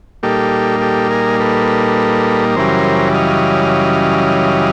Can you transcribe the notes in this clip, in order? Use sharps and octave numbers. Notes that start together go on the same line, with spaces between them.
A#2 G3 A#3 D#4 G4 A4
G4 A4
G#4 A#4
A4 B4
F#2 C#3 E3 G3 A#4 C5
D#5 F5